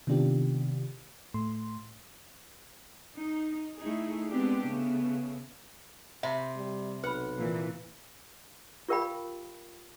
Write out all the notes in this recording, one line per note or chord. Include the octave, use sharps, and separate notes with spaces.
C3 D#3 B3 D4 F4 G4
A2 A3 C6
D#4
A3 D#4 E4 G#4
G#3 B3 C4 D4 G4
C#3 A3 B3
C3 E5 B5
G3
B1 B4 F#5 B5
A#2 E3
F4 G4 A#4 F5 G5 B5